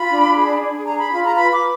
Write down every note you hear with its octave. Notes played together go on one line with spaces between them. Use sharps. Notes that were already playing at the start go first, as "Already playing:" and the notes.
Already playing: F4 B5
D4
G#4
D4
G#4 A#5
B5
F4 B5
A#5
B4 B5
D6